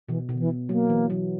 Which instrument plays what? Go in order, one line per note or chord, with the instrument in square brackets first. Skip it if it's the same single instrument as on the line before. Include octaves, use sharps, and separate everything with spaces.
[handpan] B2 [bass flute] E3
[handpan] B2
[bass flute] D3
E3
[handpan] F#3 [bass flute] A#3
[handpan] E3
F#3